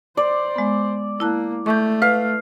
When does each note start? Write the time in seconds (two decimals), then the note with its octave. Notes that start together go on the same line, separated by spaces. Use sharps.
0.17 C5 D5
0.56 G#3 B3
1.20 A#3 E4 A5 F#6
1.66 A3 C#6 G6
2.02 B4 F5